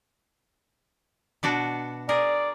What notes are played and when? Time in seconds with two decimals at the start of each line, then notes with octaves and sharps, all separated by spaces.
1.43 B2 D4 F#4
2.09 G#4 A#4 D5